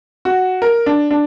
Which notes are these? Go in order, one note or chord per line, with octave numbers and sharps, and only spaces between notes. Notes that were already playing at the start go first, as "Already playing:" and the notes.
F#4
A#4
D4
D4